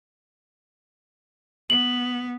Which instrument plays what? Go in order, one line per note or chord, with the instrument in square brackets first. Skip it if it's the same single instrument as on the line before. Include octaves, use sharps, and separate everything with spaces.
[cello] B3 [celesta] F#7